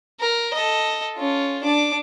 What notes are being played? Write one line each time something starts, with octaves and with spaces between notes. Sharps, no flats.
A#4
A4 D#5
C#4 F4
D4 D6